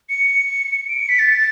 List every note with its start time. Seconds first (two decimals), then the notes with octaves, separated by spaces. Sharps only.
0.09 C#7
0.88 D7
0.99 C#7
1.09 B6
1.19 A6